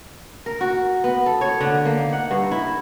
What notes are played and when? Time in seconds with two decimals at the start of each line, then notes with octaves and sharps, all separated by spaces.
0.46 A#4
0.61 F#4
1.04 B3
1.26 A4
1.41 C#5
1.61 D3
1.85 A#3
1.99 D#4
2.13 F#5
2.31 G2
2.51 E4